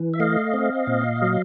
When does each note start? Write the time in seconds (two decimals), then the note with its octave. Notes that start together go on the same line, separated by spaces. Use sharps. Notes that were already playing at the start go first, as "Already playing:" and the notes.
Already playing: E3
0.14 E5
0.20 A3 D#5 F5
0.53 C4
0.87 A#2
1.22 F#3